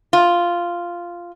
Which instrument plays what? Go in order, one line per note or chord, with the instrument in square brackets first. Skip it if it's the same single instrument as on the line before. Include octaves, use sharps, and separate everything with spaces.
[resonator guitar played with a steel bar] F4